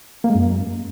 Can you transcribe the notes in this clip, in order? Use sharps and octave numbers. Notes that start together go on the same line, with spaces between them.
A#3
G#3
F#2